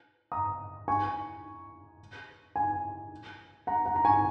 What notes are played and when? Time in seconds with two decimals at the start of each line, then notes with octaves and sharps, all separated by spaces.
0.32 A#5 D#6
0.88 G#5 C#6
2.56 G#5
3.67 F#5 A#5
3.86 F#5 A#5
3.96 A#5
4.05 G#5 C#6